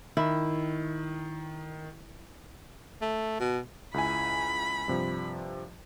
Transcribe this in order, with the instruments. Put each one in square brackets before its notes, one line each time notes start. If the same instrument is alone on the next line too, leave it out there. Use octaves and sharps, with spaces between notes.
[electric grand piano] D#3 [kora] E4
[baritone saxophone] A3
B2
[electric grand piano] C#2 E4 G#5 [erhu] B5
[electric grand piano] G2 C3 F3